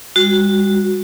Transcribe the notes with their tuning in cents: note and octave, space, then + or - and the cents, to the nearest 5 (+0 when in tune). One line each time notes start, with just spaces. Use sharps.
G3 +45 F#4 -10